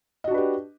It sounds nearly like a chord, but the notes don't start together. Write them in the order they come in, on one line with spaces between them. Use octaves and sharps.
D#5 F#4 D4 B4 G4